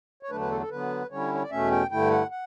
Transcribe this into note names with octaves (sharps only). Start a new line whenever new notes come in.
C#5
E2 D3 F#3 A3 D4 B4
B4
A4
A4
D3 F#3 B3 B4
D3 G3 C#4 E4 C#5
C#5
D5
E2 B2 A3 C#4 E5
G5
G2 D3 A3 E4 G5
F#5
F#5